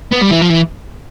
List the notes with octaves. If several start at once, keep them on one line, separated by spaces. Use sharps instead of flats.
B3
G3
E3
F3
E3